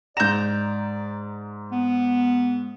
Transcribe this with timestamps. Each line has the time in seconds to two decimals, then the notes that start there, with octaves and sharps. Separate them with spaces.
0.17 G#2 D5 A#5 G6 E7
1.72 B3